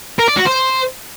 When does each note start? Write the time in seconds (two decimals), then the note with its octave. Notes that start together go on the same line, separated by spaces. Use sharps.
0.19 A#4
0.28 D5
0.37 F#4
0.46 C5